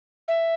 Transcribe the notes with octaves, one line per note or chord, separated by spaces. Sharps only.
E5